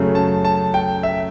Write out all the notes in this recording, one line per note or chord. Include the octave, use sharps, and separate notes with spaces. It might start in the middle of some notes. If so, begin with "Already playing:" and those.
Already playing: F#2 C#3 F#3 A3
A5
A5
G5
E5